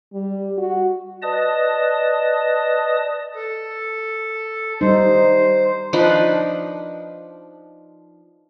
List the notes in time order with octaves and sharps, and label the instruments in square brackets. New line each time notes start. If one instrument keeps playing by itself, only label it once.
[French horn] G3
F#4
[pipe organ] B4 D5 D#5 A5 D#6
[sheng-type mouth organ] A4
[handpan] G3 D#4 [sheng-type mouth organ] C5
[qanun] F3 D4 D#4 B4